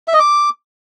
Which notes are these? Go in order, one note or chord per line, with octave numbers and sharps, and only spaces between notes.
E5
D#5
D6